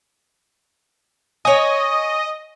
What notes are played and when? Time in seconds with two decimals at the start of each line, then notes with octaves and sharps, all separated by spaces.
1.45 C#5 D#5 G#5